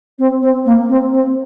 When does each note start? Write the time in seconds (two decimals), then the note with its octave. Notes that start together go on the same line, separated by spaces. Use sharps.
0.18 C4
0.41 C4
0.65 A#3
0.88 C4
1.12 C4